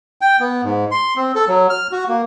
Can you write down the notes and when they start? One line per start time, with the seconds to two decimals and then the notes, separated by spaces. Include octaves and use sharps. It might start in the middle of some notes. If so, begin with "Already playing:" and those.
0.21 G5
0.40 B3
0.63 G#2
0.91 C6
1.16 C4
1.35 A4
1.48 F#3
1.70 F6
1.92 F#4
2.08 A#3